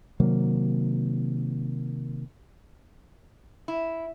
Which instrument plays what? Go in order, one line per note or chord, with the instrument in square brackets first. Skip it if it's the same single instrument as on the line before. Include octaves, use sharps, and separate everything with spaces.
[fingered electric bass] C3 D#3 F#3 A#3
[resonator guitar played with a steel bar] E4